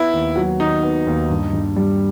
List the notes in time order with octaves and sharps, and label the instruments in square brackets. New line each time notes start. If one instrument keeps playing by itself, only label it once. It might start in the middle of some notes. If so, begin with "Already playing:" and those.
Already playing: [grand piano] B3 [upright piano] E4
[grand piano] D#2
F#3
[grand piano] D#3 [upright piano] D#4
[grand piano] B3
D#2
G2
G2
G3